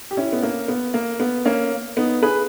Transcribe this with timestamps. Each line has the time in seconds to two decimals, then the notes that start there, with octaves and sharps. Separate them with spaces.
0.11 G4
0.17 C#4 E4
0.33 B3
0.42 A#3 C#4
0.68 B3
0.94 A#3
1.20 B3
1.45 A#3 C#4
1.97 B3 D#4
2.22 G#4 B4